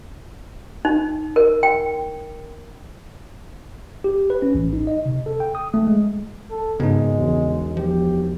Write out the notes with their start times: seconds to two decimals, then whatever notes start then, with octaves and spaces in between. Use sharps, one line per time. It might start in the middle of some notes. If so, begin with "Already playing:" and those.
0.85 D#4
1.36 A#4
1.63 G5
4.04 G4
4.30 B4
4.42 C#4
4.55 A1
4.73 D#4
4.87 D#5
5.06 C3
5.26 A4
5.40 G5
5.55 D#6
5.74 A3
5.87 G#3
6.50 A4
6.80 G#1 C#3 G#3 B3 D#4
7.18 E1
7.77 F3 G4